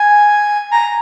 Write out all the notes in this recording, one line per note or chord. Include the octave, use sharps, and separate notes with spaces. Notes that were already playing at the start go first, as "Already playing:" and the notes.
Already playing: G#5
A#5